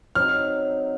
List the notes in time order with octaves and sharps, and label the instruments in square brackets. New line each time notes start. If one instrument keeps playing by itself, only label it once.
[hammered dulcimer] F#3 C4 D#4 [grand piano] F6